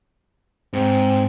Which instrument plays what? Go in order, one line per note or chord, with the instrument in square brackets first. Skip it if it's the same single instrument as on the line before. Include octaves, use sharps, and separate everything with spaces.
[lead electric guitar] G#2 [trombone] C4